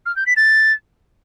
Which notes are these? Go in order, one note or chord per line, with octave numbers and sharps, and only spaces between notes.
F6
G6
B6
A6